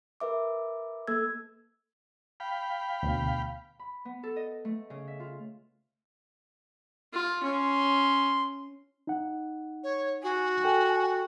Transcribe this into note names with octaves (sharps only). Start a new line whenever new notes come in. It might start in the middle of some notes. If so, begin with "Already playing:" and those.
A#4 B4 E5 D6
A#3 A4 E6 G#6
F5 G5 B5
D2 B2
B5
B3
A4
D#5
A3
C#3
E5
F4
F4
C#4 C6
D#4 F#5
C#5
F#4 G#5
A4 G5